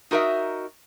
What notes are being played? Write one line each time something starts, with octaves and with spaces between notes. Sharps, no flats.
D#4 F#4 A#4 D#5 E5